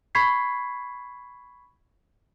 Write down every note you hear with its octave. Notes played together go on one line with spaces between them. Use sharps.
B5 C#6 G#6 B6 C7